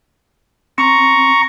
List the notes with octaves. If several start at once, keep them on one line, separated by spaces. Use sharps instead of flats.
C4 A#5 C#6